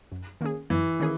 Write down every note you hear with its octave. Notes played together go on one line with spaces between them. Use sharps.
F#2
D#3 A#3 C#4 G#4
F#2 E3
D#3 A#3 C#4 G#4